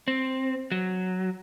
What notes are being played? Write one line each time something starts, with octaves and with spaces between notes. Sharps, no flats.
C4
F#3